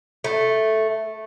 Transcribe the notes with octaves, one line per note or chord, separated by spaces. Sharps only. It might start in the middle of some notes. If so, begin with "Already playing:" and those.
A3